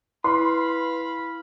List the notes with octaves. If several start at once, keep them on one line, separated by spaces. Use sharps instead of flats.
E4 B4 F5 B5 C6